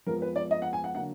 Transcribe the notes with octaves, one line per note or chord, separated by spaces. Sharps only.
F2 F3 G#3 B3 A#4
B4
D5
D#5
F#5
G#5
F#5
D3 F#3 A#3 F#5